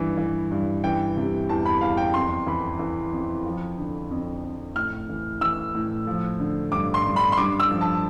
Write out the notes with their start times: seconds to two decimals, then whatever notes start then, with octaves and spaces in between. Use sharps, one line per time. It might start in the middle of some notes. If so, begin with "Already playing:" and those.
Already playing: G2 E3
0.17 E3
0.51 G2
0.84 E3 G5
1.17 C3
1.49 E2 A5
1.65 B5
1.81 E2 F5
1.97 G5
2.14 F2 C6
2.46 E3 B5
2.79 E3
3.13 F2
3.45 F3
3.78 D3
4.11 F2
4.44 F2
4.76 A2 F6
5.09 E3
5.41 E3 E6
5.75 A2
6.07 F3
6.40 D3
6.72 G2 D6
6.94 C6
7.06 G2
7.16 B5
7.32 C6
7.37 G2 D6
7.60 E6
7.71 F3
7.81 A5